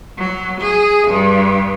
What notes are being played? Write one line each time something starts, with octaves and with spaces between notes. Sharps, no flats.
F#3
G#4
G2